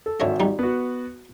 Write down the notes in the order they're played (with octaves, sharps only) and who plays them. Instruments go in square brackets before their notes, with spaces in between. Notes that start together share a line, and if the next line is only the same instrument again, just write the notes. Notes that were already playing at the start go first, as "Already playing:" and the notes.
[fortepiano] A4
[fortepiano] G#1 E5 [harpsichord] D3 C#5 D#5
[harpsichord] G3 D#4
[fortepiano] B3 F#4